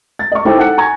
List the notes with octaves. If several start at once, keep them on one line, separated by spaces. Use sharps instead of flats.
A6
D#5 C#6
D#4 E4 A4 C5 G5 D6
A4 F#5 F#6 C#7
G#5 A#5 C#6 G#6